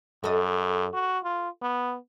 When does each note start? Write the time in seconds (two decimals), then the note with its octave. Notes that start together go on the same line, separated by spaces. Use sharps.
0.24 F#2 A4 D#5
0.93 F#4
1.24 F4
1.62 B3